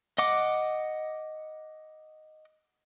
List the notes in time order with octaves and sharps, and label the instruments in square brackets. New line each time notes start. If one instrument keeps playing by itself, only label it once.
[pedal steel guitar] D#5 F#5 D6